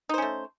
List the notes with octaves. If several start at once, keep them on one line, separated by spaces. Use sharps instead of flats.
A3 C#4 D#4 C5